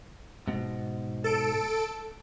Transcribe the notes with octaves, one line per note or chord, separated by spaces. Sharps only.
G#2 B2
A4 D7